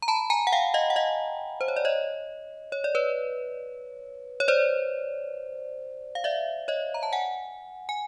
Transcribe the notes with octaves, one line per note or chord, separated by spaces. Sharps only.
A#5
A5 B5
G#5 A#5
F#5
F5 G5
D#5 F5
F#5
D#5 F5
C5
C#5
D5
C#5 D#5
C#5
D5
B4 C#5
C#5
C5 D5
F5
D5 E5
C#5 D#5
A#5
A5
F#5 G#5
G#5